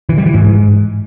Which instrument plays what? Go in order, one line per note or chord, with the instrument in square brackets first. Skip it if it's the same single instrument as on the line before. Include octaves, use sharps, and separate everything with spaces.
[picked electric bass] E3
G3
E3
G#2